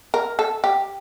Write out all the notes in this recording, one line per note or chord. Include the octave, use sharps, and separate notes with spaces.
A#4
A4
G4